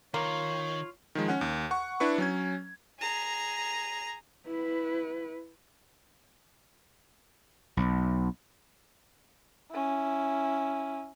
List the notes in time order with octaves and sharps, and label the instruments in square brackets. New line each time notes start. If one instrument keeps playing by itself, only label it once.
[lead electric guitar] D#3 [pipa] A#3 [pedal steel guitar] F4 [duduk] C#5
[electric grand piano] D#3 F3 G#3
C#4 F#5
D#2
F#5 C#6
D4 E4 B4 C#6
F#3 C#4 G#6
[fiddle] G#4 A#5
[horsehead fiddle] E4 B4
[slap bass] B1
[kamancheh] C#4 E4